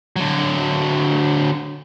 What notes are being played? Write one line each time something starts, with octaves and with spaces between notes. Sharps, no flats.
D3 F#3